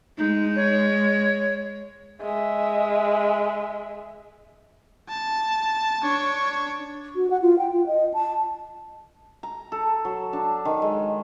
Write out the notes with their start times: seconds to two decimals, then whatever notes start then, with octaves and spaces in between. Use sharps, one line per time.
0.18 G#3 D#4
0.56 C#5
2.21 G#3 E5
5.09 A5
6.02 D4 C#5
7.16 F#4
7.31 F#5
7.42 F4
7.58 G5
7.72 F4
7.87 D#5
8.14 A5
9.43 A#5
9.72 A4
10.05 F#3
10.33 D4
10.65 D#3
10.82 G#3